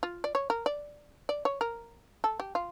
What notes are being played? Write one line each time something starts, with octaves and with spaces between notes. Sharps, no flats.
F4
D5
C#5
A#4
D5
D5
C#5
A#4
A4
G4
F4